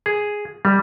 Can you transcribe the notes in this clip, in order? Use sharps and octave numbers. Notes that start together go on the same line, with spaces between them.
G#4
G3